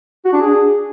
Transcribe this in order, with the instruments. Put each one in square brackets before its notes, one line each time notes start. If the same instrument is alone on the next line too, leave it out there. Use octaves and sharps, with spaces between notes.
[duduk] F#4
D4
G#4